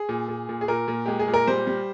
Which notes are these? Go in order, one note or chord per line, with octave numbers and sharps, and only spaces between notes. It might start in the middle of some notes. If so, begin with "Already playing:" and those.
Already playing: G#4
A#2
A#2
A#2
G#4
A#2 A#4
A#2
G#3 G4
G#4
A#2
A#4
G3 C5
G3